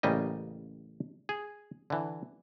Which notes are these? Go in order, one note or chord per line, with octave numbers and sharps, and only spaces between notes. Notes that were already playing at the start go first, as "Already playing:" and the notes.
A1 C#3 G3 A#3 D#5
G#4
D3 E3